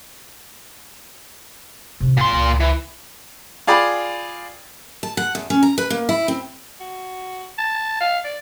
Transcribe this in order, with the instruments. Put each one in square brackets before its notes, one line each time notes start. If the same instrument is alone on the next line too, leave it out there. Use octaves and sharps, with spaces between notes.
[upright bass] C3 D#3
[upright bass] G#1 [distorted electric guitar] A#2 C6
[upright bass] C#2
[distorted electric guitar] E3
[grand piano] F4 G#4 D5 G5 B5
[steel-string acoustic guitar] A5
F#5
E2
C#4
A#5
B4
A#3
E4
C4
[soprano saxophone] F#4
A5
F5
D5